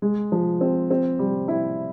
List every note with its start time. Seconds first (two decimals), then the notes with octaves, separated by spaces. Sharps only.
0.02 G#3
0.32 F3
0.61 C4
0.91 C4
1.19 G3
1.48 E4